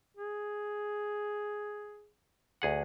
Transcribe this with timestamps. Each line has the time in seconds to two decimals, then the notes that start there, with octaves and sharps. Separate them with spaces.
0.17 G#4
2.62 D2 G#4 F#5